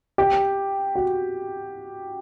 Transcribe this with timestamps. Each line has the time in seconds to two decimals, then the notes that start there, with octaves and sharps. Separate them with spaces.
0.18 G4
0.95 F#4